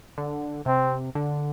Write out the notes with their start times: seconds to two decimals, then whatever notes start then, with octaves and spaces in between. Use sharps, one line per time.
0.18 D3
0.66 C3 C4
1.15 D3